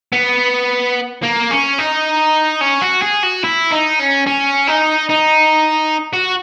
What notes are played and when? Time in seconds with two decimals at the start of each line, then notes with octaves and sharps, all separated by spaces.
0.13 B3
1.23 A#3
1.51 C#4
1.78 D#4
2.61 C#4
2.82 F#4
3.02 G#4
3.23 F#4
3.44 E4
3.71 D#4
3.99 C#4
4.27 C#4
4.68 D#4
5.10 D#4
6.13 F#4